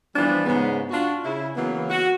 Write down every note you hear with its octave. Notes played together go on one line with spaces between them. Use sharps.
E3 F3 G3 B3 D4
G#2 C#3 B3
D4 F4 F#4
C#3 E4
C#3 E3 F#3 A#3 B3
F#4